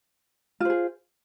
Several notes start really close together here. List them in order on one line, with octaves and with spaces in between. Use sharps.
F4 C5 G#4